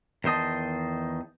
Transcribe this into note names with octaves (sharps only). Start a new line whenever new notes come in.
E2 D#3 C5 D#5 A5